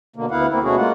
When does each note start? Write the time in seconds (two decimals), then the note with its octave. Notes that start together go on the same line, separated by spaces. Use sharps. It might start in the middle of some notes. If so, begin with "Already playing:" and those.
0.16 B2 D3 A#3
0.31 D2 B3 E4 F5 F#5
0.50 A#3 C4 E4
0.63 B2 A3 C#4 F#4 G#4
0.77 G#3 A#3 F4 F#5